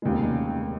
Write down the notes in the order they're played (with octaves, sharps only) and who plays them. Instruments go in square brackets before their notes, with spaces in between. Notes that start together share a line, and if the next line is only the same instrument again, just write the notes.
[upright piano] F1 D#2 C#3 G#3